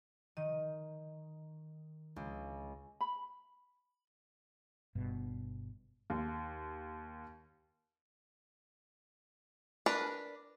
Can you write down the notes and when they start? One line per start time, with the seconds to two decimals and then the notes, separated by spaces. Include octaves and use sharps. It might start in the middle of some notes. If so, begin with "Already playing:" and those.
0.37 D#3 D#5
2.16 C#2
3.01 B5
4.95 G1 G2 B2
6.10 D#2
9.86 D4 A#4 B4